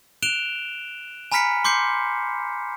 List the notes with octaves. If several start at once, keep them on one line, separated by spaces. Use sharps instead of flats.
F#6 D7 E7 F7 G7
G#5 A#5 B5 F6 B6 C#7
C6 D6 G6 C7 C#7